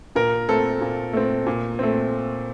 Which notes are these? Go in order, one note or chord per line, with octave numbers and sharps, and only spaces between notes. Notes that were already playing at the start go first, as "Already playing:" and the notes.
A#2 A#4
A3 C4 A4
A#2
A3 C4
A#2
A3 C4